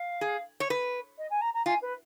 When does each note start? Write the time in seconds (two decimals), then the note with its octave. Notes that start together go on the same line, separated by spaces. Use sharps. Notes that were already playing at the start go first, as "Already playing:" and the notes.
Already playing: F5
0.21 G#4
0.60 C#5
0.70 B4
1.18 D#5
1.31 G#5
1.41 A#5
1.54 A#5
1.66 F4 G#5
1.82 B4